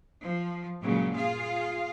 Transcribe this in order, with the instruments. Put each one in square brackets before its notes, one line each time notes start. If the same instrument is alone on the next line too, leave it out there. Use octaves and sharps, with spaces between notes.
[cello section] F3
G2 A#2 C#3 F#3 G#3
F4 G#4 F5